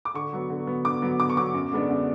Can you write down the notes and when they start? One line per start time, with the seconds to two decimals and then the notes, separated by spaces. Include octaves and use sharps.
0.05 D6
0.14 D3 C#6
0.33 F#3 B3
0.50 D3
0.67 F#3 B3
0.85 D3 D6
1.02 F#3 B3
1.19 D3 D6
1.30 C#6
1.37 F#3 B3 D6
1.54 F#2
1.71 D3 G#3 B3 D4
1.90 F#2